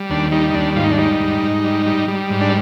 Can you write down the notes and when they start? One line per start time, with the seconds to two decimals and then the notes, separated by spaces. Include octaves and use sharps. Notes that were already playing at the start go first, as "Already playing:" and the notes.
Already playing: G3
0.10 D#2 D4
0.32 G3 D#4
0.50 D#4
0.54 D#2 D4
0.76 G#2 F4
0.84 D#4
0.91 D4
0.98 G3 D#4
1.20 G#2
1.42 G#2
1.64 G3
1.86 G3
2.08 G3
2.30 G#2
2.41 D4